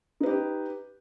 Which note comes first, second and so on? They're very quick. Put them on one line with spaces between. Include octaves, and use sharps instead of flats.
D#4 B4 G4